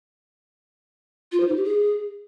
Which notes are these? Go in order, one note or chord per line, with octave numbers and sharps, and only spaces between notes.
F4
C5
D#4
G4
G#4